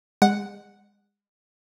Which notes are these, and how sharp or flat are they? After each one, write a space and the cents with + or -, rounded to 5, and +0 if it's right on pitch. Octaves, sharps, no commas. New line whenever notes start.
G#3 -35 F#5 +0